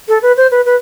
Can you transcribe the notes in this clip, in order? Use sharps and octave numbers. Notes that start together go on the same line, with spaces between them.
A4
B4
C5
B4
B4